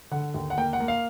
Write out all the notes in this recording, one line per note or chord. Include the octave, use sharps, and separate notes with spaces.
D3 F#5
D#2
F#5
A#3 G5
F#5
A#3
F5